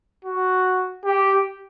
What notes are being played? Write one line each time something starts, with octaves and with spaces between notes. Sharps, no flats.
F#4
G4